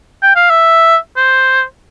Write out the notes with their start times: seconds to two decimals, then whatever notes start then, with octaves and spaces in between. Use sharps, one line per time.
0.23 G5
0.36 F5
0.50 E5
1.16 C5